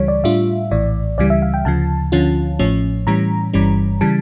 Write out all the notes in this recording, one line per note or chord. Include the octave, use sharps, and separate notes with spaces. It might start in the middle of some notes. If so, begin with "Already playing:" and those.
Already playing: C#2 C#3 E3 G3 C#5
D5
A2 G3 D4 F4 E5
A#1 A2 E3 D5
C#2 C#3 E3 G3 D5
E5
F5
G5
D2 C#3 F3 A5
D2 D3 F3 C#4 F4
A1 A2 F3 C#4
A2 E3 G3 C#4 A#5
G1 G2 E3 G3 C#4
C#3 E3 G3 A5